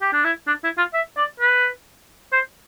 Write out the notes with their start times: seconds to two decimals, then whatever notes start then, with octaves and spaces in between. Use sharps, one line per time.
0.01 G4
0.13 D4
0.24 E4
0.47 D4
0.64 E4
0.78 F4
0.94 E5
1.17 D5
1.40 B4
2.32 C5